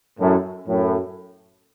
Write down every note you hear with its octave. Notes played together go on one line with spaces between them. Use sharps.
F#2 A2
F#2 A2